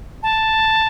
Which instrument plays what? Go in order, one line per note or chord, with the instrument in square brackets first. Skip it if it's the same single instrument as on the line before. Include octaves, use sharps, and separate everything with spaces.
[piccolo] A5